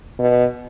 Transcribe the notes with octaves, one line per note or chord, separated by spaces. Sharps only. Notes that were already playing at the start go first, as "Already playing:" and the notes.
B2